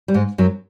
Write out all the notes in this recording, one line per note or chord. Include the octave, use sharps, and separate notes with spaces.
G3
G#2 G#3
F#2 F#3